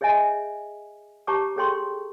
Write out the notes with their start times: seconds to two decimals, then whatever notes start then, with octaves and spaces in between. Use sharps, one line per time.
0.01 G#4 C#5 D#5 E5 G#5
1.27 G4 C#5 A5 A#5 C#6 D6
1.56 G#4 A4 C#5 G5 C6 C#6